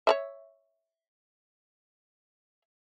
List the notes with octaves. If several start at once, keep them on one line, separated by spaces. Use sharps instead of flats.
C#5 D5 E5